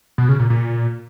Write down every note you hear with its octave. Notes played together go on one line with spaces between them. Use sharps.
B2
C#3
A#2
A#2